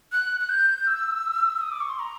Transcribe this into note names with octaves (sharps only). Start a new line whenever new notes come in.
F#6
F#6
G6
E6
E6
D#6
D6
C#6
C6
A#5